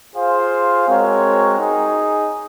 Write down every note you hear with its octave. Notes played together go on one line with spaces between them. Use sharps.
F4 G#4 C5 F5
G#3 C4 F#4 A#4 C#5
D#4 G#4